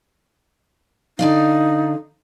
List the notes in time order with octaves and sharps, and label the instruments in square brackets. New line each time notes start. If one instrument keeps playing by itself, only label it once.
[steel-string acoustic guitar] D3 D5 F5 [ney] D#4